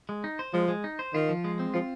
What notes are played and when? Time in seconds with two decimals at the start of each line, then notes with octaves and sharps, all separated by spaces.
0.09 G#3
0.24 D#4
0.39 C5
0.54 F3 G#3
0.68 G#3
0.84 D#4
0.99 C5
1.14 D#3 F4
1.29 F3
1.44 G#3
1.59 C4
1.74 F3 F4